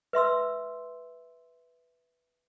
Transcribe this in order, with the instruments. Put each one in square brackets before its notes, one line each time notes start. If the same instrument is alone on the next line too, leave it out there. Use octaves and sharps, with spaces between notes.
[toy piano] B4 E5 C6 E6